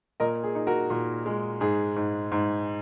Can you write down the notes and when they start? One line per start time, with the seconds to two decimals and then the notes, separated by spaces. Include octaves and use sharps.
0.20 A#2 A#4 D#5
0.44 G#4
0.55 D#4
0.67 F#4 A#4
0.90 A#2
1.26 G#3
1.61 G#2 G#4
1.96 G#2
2.32 G#2